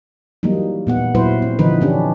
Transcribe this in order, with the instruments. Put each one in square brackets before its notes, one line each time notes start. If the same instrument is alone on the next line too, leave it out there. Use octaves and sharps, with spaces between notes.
[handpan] E3 F#3 G3 A#3 D#4
A#2 B3 F#5
A#2 F#3 E4 B4 C5
C4
D3 E3 F3 D#4 B4
E3 C#4 D4 G4